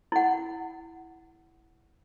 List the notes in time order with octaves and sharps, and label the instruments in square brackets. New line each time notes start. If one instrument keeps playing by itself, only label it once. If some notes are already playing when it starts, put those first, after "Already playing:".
[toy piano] E4 F#5